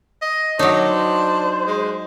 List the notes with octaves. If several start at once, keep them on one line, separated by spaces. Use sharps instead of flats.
D#5
F#3 D4 D#4 C#5
C5
G#3